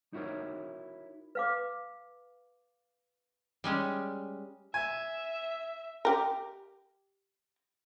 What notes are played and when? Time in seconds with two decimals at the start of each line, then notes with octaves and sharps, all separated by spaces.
0.13 D#4 E4 F#4 A#4 C#5
1.35 B4 F5 D6
3.64 G3 G#3 C#4
4.74 E5 G#5
6.05 G4 A#4